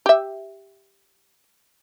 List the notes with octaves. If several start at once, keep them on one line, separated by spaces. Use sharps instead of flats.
G4 E5